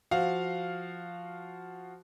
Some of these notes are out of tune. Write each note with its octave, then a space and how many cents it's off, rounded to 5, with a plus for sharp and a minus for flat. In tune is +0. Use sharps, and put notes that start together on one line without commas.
F3 +0 F#4 +0 F5 +0